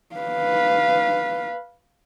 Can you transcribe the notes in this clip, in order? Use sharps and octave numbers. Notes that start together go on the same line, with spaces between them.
B4 F5